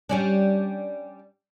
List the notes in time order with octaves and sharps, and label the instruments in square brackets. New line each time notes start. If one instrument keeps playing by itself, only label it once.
[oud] G3 C#4 D4